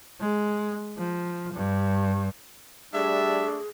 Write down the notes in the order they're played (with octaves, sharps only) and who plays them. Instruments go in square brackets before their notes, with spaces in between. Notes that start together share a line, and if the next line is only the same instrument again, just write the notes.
[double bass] G#3
F3
G2
[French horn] G3 [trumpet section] A3 D4 [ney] G#4 [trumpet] E5